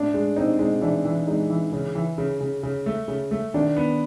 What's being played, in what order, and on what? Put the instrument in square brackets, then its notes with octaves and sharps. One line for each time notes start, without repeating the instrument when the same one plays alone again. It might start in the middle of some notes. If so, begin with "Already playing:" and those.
Already playing: [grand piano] A2 [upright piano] D4
[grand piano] G#3
[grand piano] C4 [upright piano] D#4
[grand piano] G#3 [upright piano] D#4
[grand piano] E3 [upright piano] D4
[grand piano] E3
[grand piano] G#3 [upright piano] D#4
[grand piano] E3
C#3
E3
C#3
C#3
C#3
A3
C#3
A3
[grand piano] D#3 [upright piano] D4
[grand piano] B3